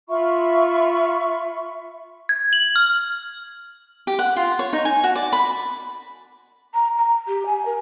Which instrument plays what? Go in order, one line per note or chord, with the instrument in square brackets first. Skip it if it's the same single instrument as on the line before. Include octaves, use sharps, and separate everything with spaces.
[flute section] F4 E5 B5 C#6
[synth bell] G#6
F#7
F6
[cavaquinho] G4
F#5
F4
C#5
D#4
G#5
F#4
D5
B5
[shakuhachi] A#5
A#5
G4
G#5
A#4